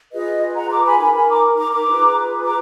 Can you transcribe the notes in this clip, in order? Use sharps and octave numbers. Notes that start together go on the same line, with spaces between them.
F4 G#4 B4 D#5
F#5 A#5
A#5 D6
G#5 B5
D#4 A#4 G#5 B5
G#5 B5
A#5 D6
A#5 D6
A#5 D6
F4 G#4 B4
A#5 D6